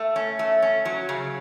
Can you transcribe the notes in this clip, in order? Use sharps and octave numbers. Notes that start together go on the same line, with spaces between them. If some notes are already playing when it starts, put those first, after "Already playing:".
Already playing: A3
C#4
A3
C#4
F#3
C#3